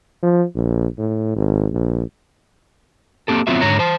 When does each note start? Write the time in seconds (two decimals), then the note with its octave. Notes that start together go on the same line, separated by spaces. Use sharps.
0.23 F3
0.55 A#1
0.98 A2
1.36 G#1
1.73 A#1
3.28 A#3 C4 G4 A4
3.47 F#3 B3 C4 F4 F#4 E5
3.61 G#2 D3 C#5 A#5
3.79 C5 A5